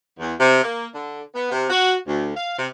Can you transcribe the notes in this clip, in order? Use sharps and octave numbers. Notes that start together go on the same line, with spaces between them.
E2
C3
A#3
D3
B3
C3
F#4
D2
F5
C3